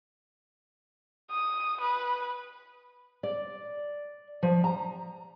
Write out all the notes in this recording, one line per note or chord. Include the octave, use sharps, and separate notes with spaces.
D#6
B4
D5
F3
A#5